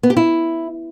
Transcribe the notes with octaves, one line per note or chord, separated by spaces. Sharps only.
B3
G4
E4